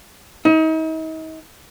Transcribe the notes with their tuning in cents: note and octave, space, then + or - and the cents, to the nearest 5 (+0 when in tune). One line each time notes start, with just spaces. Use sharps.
D#4 +40